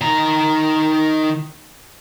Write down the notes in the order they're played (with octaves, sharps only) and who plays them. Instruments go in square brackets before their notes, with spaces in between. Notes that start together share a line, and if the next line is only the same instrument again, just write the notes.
[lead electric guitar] D#3 A#5